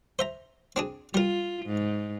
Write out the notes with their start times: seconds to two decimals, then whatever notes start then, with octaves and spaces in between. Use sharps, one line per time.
0.19 C5 E5 A#5
0.76 C4 D4 G#4
1.14 G3 F4 A#4
1.66 G#2